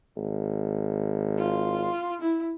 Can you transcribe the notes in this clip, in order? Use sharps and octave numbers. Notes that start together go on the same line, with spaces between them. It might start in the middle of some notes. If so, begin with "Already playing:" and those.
G#1
F4
E4